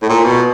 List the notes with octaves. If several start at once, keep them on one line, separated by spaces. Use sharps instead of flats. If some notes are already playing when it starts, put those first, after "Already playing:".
A2
A#2
B2